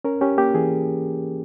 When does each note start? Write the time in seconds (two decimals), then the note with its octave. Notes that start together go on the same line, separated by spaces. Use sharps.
0.04 C#4 A#4
0.21 C#4 G4
0.38 A#3 G4
0.54 E3 G#4